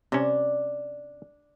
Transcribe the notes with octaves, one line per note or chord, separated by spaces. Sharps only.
C3 C#4 D4